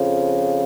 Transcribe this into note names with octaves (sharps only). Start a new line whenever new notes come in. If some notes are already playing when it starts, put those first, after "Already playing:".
Already playing: F2 C#3 F3